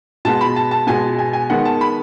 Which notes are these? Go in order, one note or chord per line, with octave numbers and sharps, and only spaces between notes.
B2 G#3 B3 A5
B5
A5
A5
B2 G#3 B3 G#5
G#5
G#5
D#3 G#3 B3 F#5
A5
B5